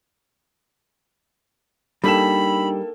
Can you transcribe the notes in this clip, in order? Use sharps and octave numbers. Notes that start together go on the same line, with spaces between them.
G3 A#3 D4 D#4 A4 G5 B5 E7